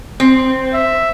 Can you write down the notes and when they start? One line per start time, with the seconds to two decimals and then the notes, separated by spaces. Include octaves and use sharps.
0.20 C4
0.73 E5